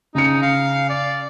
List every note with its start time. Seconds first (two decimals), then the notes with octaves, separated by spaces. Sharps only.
0.15 C#3 D#4 C#7
0.42 F5
0.90 D5